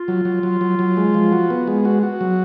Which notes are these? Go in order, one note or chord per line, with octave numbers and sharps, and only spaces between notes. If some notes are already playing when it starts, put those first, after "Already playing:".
Already playing: F4
F#3
F#3
F#3
F#3
F#3
G#3
F3
F#4
B3
G#3
F#4
F#4
F#3